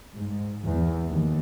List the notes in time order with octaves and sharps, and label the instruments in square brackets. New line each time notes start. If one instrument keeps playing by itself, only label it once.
[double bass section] G#2
E2
D#2